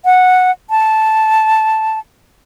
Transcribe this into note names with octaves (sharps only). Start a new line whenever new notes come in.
F#5
A5